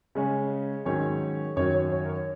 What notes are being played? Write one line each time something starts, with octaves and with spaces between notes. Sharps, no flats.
C#3 G#3 C#4
G#2 D#3 F#3 C#4 C#5
F#2 D#3 F#3 C#5
C#5
C#5
A#4
C#5